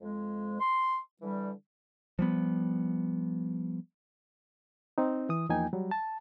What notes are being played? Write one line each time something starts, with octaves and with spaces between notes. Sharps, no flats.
F2 G#3
C6
D3 E3 G3
F3 G3 B3
C4 D#4
E3 D#6
E2 F3 A#3 D#4 G5 G#5
F#3 G3
A5